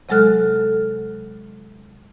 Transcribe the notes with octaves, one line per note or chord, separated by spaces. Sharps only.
C3 F#3 G#3 A4 F6 F#6